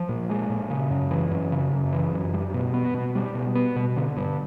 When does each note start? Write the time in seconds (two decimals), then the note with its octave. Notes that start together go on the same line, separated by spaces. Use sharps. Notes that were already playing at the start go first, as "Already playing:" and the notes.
Already playing: F3
0.09 A#2
0.30 G#3
0.50 A#2
0.71 C#3
0.90 F#2
1.11 E3
1.31 F#2
1.52 C#3
1.71 F#2
1.93 E3
2.13 F#2
2.34 G3
2.54 B2
2.74 B3
2.94 B2
3.15 G3
3.35 B2
3.55 B3
3.76 B2
3.96 D3
4.17 G2